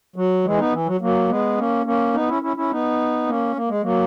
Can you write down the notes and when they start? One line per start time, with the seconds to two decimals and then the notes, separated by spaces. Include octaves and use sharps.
0.16 F#3
0.44 E3 G#3
0.58 B3 D#4
0.73 E3
0.86 F#3
1.01 F#3 A#3
1.29 G#3 B3
1.58 A#3 C#4
1.86 A#3 C#4
2.14 B3 D#4
2.28 C#4 E4
2.42 C#4 E4
2.57 C#4 E4
2.71 B3 D#4
3.27 A#3 C#4
3.56 A#3
3.68 G#3
3.82 F#3 A#3